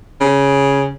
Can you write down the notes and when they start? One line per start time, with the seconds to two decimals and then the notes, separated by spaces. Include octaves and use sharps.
0.21 C#3